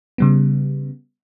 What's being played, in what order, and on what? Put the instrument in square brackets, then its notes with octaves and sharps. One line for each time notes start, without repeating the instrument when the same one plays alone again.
[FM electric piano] C#3 G3 B3